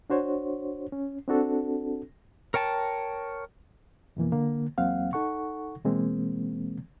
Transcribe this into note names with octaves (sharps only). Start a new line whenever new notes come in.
D4 F#4 C5 C#5
C#4
C4 D4 F#4 A4
A#4 C#5 G5 A5
F2 B2 E3 A#3
D3 A#3
E2 F#3 A#3 C4 F5 F#5
D#4 A4 F#5 C#6
B2 E3 G#3 A#3 C4